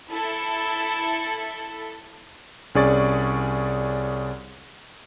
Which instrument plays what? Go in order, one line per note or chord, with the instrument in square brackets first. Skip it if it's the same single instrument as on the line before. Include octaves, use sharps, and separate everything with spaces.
[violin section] E4 A4
[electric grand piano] C2 C#4 G#4 D5 C#6 A6